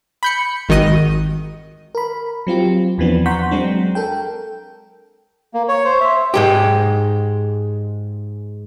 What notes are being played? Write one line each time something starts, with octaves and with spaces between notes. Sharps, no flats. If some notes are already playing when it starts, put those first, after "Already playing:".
B5 G6 C#7
G#1 D#3 F#4 D#5 D#6
A#4 B5
F#3 C4 F4 G4
E2 E3 F3 B3 C4 D4
F#5 A#5 C6 C#6 G6 B6
F#3 G#3 C4 D4
A4 A#4 G5
A#3
C#5
C5
E5
G#2 G#3 G4